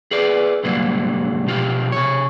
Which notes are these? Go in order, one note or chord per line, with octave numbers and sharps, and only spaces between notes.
G#4 B4 D5
C2 G#2 D3 F#3 G3 A#3
B2 F3 F4 G4
C3 C#5